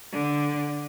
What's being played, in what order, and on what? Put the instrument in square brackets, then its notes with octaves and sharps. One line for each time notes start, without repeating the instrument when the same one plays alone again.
[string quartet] D3